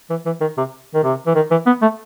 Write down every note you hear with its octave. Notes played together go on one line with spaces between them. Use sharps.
E3
E3
D#3
C3
D#3
C3
E3
D#3
E3
B3
A3